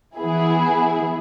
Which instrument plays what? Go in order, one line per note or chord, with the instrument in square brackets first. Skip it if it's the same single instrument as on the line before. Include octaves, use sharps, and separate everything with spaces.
[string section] E3 B3 E4 G#4